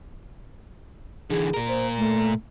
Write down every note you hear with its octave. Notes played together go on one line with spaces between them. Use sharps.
D3 E3 G#4
A#2 A#4
C5
A3